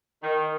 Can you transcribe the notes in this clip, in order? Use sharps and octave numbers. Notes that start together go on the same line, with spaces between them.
D#3